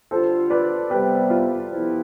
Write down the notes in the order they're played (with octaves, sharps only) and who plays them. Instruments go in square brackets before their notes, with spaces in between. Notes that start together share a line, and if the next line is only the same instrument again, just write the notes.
[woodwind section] D3 G3 D4 F4 [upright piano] A4 C5
[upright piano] B4 D5
[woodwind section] C3 G3 B3 [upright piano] G4 B4
[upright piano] F4
[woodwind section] F2 C3 F3 B3 E4